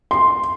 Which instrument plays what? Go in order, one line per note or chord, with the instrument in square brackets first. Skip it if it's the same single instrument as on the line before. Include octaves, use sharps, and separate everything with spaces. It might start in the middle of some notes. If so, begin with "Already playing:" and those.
[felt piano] C6